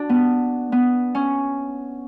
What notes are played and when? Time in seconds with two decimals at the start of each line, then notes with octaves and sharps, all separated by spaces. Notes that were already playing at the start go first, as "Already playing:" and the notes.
Already playing: D4 F#4
0.09 B3
0.72 B3
1.15 C#4